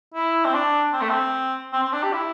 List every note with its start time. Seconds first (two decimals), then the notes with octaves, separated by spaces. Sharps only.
0.14 E4
0.45 C4
0.54 D4
0.93 C4
1.01 A3
1.09 C4
1.73 C4
1.83 C4
1.93 D4
2.03 G4
2.13 E4